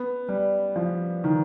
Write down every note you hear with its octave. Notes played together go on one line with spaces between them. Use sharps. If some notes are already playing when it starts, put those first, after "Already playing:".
Already playing: B3
G3
F3
D#3